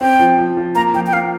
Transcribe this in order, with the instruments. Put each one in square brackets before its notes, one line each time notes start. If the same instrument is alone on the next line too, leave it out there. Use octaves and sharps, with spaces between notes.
[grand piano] C4 [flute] G5
[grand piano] F3
F3
F3
[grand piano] A#3 [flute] A#5
[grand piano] F3 [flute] G5
[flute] G5
[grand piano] A#3 [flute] F5